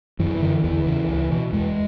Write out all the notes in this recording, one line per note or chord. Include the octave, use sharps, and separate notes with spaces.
F#2 E3
D3
E2 E3
C#3
C#2
B2
E2 G#3